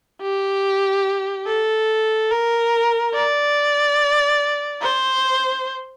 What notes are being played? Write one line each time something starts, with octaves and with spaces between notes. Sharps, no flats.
G4
A4
A#4
D5
C5